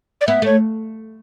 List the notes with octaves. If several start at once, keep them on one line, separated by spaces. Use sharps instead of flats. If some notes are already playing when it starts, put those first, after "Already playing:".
D5
B3 E5
A3 C#5